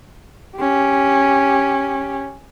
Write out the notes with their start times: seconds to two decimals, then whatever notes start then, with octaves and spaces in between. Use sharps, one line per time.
0.57 C#4 G4